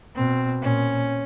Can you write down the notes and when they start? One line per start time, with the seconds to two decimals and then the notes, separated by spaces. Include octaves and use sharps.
0.16 B2 C4
0.62 A#2 C#4